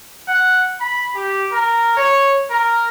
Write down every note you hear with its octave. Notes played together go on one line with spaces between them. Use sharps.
F#5
B5
G4
A#4
C#5
A#4